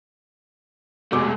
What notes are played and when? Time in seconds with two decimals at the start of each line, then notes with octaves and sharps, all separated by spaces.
1.12 F1 B2 G#3 A3 D6